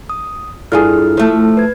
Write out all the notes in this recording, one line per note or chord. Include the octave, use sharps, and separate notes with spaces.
D#6
G2 E4 F4 G#4 A4 F6
F3 A3
B4 G#6